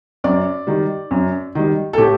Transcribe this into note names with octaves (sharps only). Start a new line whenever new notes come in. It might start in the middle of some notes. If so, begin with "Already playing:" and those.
F#2 D5
D#3 G3
F#2
D#3 G3
A4
A2 G4